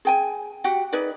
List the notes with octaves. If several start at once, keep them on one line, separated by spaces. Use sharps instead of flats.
G#4 G5 G#5
F#4 G4 F#5 G5
D#4 G#4 B4 D5